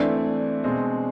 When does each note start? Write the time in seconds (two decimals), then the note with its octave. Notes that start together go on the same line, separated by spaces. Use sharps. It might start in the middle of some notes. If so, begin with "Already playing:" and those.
Already playing: E3 A3 C4 D4 E4
0.64 B2 G#3 C4